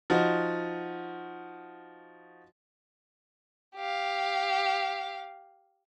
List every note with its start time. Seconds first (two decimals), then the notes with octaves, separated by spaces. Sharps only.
0.10 F3 D#4 F#4
3.76 G4 F5